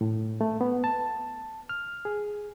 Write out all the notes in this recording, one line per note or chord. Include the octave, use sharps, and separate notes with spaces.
A2
A3
B3
A5
F6
G#4